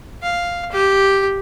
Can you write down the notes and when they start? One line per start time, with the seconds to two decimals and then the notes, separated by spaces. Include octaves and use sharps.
0.22 F5
0.72 G4